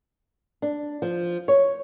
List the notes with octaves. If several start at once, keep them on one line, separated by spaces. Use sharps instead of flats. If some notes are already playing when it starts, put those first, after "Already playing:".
D4
F3
C#5